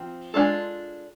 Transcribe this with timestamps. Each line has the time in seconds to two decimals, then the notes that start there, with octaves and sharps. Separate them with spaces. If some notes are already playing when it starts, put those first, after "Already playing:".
Already playing: F3 C4
0.34 G#3 B3 D4 F4 A4